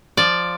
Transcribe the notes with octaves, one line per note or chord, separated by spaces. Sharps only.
F3 D5